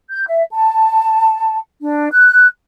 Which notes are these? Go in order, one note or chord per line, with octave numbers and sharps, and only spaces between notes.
G6
E5
A5
D4
F#6